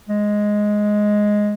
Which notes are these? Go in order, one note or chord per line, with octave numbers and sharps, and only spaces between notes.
G#3